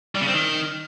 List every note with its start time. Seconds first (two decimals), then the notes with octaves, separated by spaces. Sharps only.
0.15 G3
0.21 C#3
0.27 C4
0.33 D#3